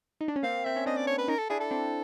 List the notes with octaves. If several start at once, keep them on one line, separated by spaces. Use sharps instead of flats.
D#4
D4
C#4
A#3 C4 F5
C4 E5
C#4
C4 D4 D#5
D5
C#5
B4
C#4 D#4 A#4
A4
D4 E4 G#4
A4
C4 D4